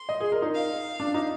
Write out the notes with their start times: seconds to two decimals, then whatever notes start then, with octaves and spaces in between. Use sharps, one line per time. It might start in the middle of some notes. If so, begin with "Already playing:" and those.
Already playing: C6
0.09 D#5
0.20 G#4
0.32 A#4
0.42 D#4
0.54 F5
1.00 D4
1.14 D#4